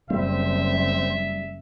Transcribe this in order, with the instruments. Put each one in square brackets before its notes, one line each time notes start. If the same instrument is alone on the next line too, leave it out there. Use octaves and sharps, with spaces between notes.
[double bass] F#1 [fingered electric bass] G3 [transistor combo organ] C4 [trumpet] E5